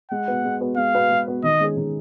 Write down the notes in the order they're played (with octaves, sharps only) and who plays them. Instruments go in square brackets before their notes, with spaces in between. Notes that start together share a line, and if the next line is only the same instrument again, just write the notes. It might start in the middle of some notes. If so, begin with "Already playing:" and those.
[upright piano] G#3 [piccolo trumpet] F#5
[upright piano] B3 F#4 B4
G#3
B3 F#4 B4
[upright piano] G#3 [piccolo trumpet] F5
[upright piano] B3 F#4 B4
G#3
B3 F#4 B4
[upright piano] D#3 [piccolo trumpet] D#5
[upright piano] G#3 C#4 G#4
D#3